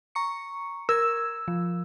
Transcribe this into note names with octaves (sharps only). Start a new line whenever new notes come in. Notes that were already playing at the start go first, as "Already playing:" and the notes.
A#5 C#6 C#7
A#4 E6 G#6 E7
F3